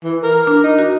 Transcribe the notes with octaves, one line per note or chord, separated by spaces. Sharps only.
E3
A#4
D4
D#4
F#4